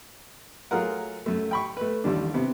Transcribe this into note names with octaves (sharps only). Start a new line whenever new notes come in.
F#3 A3 F4 G#4 A#4 F#5
F#2 A3
G5 B5 C#6
A3 B4
A1 D#2 G3 D4
C3 B3